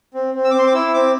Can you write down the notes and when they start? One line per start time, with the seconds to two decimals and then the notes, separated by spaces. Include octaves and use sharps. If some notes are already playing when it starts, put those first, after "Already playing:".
0.14 C4
0.34 C4
0.44 E6
0.51 D6
0.54 C4 C6
0.66 D6
0.74 E4 E6
0.94 C4 D6